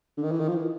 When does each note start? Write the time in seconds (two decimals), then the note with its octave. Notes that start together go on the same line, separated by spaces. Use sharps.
0.17 D3
0.23 D#3
0.32 E3
0.40 D#3
0.48 F3
0.56 E3